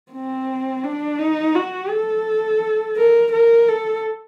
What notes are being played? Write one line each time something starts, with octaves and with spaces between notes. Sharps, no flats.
C4
D4
D#4
F#4
A4
A#4
A#4
A4